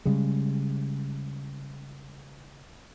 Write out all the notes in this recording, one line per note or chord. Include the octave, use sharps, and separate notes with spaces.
C#3 G3 G#3